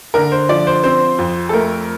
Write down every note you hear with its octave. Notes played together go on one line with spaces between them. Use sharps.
D3 A#4
C5
F3 D5
C5
C4 C5
F2
A4
A3 A#4